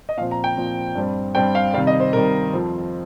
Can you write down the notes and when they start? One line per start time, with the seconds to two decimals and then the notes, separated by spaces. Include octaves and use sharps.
0.09 D#5
0.17 A#2 F5
0.20 F3 C4
0.31 A#5
0.44 G5
0.57 A#2 F3 C4
0.95 G2 G3 C4
1.35 G2 G3 C4 G5
1.55 F5
1.74 G3 F5
1.77 C3 D#3
1.87 D#5
2.00 C5
2.13 C3 D#3 G3 A#4
2.53 F2 F3 C4